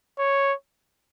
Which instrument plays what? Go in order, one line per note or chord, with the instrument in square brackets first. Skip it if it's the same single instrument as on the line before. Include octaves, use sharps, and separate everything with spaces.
[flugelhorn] C#5